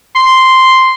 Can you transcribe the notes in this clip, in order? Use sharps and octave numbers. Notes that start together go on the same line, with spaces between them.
C6